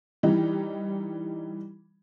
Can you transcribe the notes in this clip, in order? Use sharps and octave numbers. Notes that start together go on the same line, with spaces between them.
E3 G3 D#4